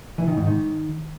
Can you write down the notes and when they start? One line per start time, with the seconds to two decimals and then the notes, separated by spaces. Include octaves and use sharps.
0.18 E3
0.28 D#3
0.37 G#2
0.47 D#3